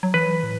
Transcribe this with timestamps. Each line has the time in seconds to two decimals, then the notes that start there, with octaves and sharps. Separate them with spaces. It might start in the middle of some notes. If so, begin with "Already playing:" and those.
0.03 F#3
0.14 E3 B4
0.43 A2